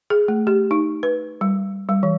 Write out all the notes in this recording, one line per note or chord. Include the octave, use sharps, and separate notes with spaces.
G#4
A3
G4
D#4
B4
G3
G3
E3